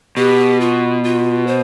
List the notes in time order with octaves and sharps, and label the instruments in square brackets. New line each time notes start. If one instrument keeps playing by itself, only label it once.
[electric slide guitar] B2 [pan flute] G4
[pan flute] F4
F4
C5